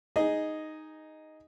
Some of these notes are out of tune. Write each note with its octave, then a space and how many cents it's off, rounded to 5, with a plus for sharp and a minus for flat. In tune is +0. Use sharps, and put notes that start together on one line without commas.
D#4 +0 G#4 +0 D#5 +0